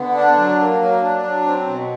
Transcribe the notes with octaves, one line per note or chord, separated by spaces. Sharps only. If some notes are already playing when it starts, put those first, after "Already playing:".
Already playing: D3 B3
D4
F#3
A#3
F#3
D4
F#3
C4
B2